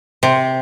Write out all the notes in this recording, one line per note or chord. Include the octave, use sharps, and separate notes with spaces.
C3